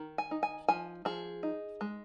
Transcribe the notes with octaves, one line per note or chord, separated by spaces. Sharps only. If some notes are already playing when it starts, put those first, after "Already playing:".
Already playing: D#3
G#5
D#4
G#5
F3 G#5
F3 G#4
D#4
G#3